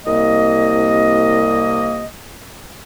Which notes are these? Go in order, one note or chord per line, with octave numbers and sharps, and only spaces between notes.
C2 A#3 D#5